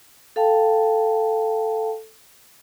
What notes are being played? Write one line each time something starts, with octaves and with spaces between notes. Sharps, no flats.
A4 F5 G5 A5